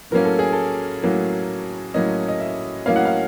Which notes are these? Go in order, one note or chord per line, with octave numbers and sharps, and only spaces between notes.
A2 F#3 A#3 C#4 A#4
A4
G#4
A4
A2 F#3 A#3 C#4
A2 F#3 A#3 C#4 D#5
D#5
E5
A2 F#3 A#3 C#4 F5
F#5
F5